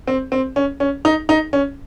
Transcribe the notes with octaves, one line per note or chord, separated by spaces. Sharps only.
C4
C4
C#4
C#4
D#4
D#4
C#4